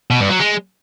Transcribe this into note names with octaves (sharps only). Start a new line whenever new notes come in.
B2
G2
F#3
G#3